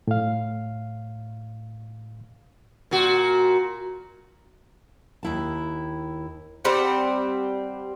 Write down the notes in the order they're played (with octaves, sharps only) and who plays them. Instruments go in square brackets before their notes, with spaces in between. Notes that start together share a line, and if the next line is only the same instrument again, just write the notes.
[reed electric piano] A2 F5
[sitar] A#2 F#4
[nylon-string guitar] D#2 E4 A5
[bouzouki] G3 C4 F#5